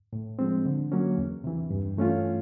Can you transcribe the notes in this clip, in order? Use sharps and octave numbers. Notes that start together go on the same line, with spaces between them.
A2
F3 G#3 C4
D3
F#3 A#3 C#4
E2
C3 E3
G2
E3 A3 C#4 F4